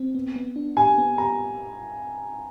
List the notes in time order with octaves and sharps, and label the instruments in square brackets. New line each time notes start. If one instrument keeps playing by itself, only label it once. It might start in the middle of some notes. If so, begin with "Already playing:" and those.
Already playing: [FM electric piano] C4
B3
B3
D4
[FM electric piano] G4 [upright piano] G#5
[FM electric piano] B3
[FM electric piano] G4 [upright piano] A#5